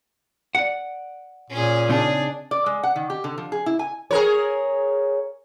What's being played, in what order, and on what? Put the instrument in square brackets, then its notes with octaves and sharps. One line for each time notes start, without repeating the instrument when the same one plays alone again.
[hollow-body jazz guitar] D5 F#5
[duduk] A#2 [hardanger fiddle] C#4 G#4
[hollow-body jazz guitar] C#3 C4 D#4 [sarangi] D4 [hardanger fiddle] G#4
[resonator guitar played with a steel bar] D5
G#3
F#5
D#3
G4
D3
F3
G#4
E4
G#5
[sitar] G#4 A#4 C#5